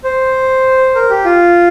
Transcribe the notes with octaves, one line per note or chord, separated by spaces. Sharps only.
C5
A#4
G4
F4